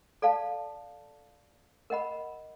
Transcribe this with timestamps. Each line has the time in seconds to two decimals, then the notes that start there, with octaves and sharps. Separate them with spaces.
0.22 A4 D5 F5 A5
1.90 A#4 D#5 F#5 B5